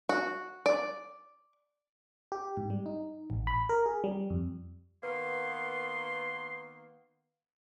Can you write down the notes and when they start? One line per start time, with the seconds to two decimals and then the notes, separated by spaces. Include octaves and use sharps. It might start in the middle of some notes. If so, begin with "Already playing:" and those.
0.09 F#4
0.66 D5
2.32 G4
2.57 G#2
2.70 G3
2.86 D#4
3.30 A1
3.47 B5
3.69 A#4
3.86 G#4
4.04 G3
4.30 F2
5.03 D#3 A#3 B3 B4 C6